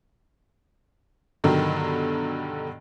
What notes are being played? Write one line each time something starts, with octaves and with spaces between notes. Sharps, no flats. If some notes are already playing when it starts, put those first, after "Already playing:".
G2 B2 D3 D#3 F#3